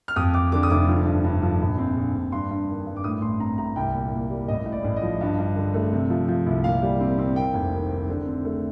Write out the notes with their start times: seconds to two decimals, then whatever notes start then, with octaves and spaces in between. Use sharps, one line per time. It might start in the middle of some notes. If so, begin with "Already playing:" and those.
0.08 F6
0.16 F2 D#6
0.34 F2 D6
0.52 D3 D6
0.63 D#6
0.70 F1 D6
0.88 F3
1.06 G2
1.24 G2
1.42 F3
1.60 A#1
1.78 C4
1.96 A#1
2.14 A#1
2.32 G2 C6
2.50 G2
2.68 D#3
2.86 G2
2.96 D6
3.04 A2 D#6
3.22 A1 C6
3.40 C4 A#5
3.58 A2 A#5
3.76 C2 G5
3.95 A#2
4.12 A#2
4.30 G3
4.48 A1 D#5
4.66 A2
4.72 D5
4.84 A1
4.96 D#5
5.02 F3
5.21 G2
5.38 G2
5.56 D3
5.74 A3
5.92 C3
6.10 F3
6.28 F3
6.46 C2
6.64 A#2 F5
6.82 G3
7.00 C4
7.18 C4
7.36 A#3 G5
7.54 F1
7.72 D#3
7.90 D#3
8.09 D3
8.26 C4
8.45 A3